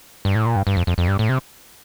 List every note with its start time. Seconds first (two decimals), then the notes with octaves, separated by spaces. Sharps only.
0.25 G2
0.35 A2
0.46 A#2
0.56 G2
0.67 G2
0.77 F2
0.87 F2
0.98 F2
1.08 G2
1.19 A2
1.29 C3